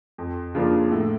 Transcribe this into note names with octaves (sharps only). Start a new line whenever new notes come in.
F2
C#3 F3 A#3 D4
A2